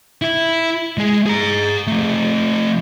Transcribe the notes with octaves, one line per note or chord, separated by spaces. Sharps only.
E4
G#3 G#4
G#4 A#5
F3 A3